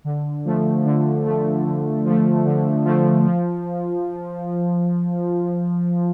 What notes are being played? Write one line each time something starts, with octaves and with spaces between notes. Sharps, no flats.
D3
F3 A3
D3
F3 A3
D3
F3 A3
D3
F3 A3
F3